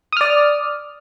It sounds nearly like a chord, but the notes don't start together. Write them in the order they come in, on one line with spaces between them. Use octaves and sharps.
D#6 F6 D5